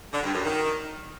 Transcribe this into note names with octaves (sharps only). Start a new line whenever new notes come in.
D3
G2
F#2
D#3